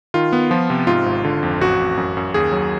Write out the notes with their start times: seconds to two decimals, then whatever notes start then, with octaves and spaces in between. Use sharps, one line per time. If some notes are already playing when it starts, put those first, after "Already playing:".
0.14 D#3 F4
0.33 B3
0.51 F3
0.70 C3
0.87 G#2 F4
1.06 G#1
1.25 D3
1.43 F2
1.61 A1 F#4
1.80 A1
1.97 F#2
2.17 F#2
2.34 D#2 G#4
2.52 F#3